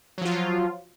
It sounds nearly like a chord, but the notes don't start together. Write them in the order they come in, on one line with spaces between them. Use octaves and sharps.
F#3 F3 F4